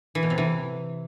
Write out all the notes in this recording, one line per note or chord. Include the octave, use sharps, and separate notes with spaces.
E3
B2
C3
E3